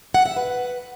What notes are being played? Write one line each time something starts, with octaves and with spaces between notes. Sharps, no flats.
F#5
E5
B4